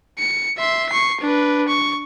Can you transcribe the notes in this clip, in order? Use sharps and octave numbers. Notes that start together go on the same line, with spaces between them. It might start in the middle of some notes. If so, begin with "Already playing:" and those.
C#7
E5 C6
C#6 C7
D4 B4
C#6